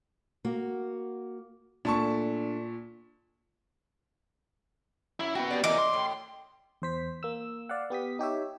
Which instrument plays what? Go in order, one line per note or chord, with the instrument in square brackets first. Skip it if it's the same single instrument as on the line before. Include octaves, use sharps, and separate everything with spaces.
[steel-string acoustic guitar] A#3 F#4
[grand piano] A#2 A5 C#6 [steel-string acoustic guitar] A3 D4
[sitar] F#2 [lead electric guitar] E4
[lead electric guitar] B3 F#4 [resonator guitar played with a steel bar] G5
[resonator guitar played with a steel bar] G3 D5
[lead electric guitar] E3 A#4 [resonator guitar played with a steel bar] D#5 [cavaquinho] D6
[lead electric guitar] C6
[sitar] A2
[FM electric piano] E2 C5 B6
A#3 E6
D5 F5 F#5
B3 G4 D#6 B6
D#4 G4 C#5 E5